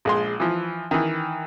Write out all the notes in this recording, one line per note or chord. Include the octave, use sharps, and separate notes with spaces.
A#1 G#3 C6
E3 F3
D#3 E3